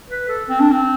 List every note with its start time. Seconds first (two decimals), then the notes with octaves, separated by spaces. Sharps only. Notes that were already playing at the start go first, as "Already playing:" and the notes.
0.10 B4
0.29 A4
0.49 C4
0.60 D4
0.72 C4